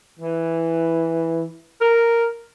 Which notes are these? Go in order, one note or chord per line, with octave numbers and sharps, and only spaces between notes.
E3
A#4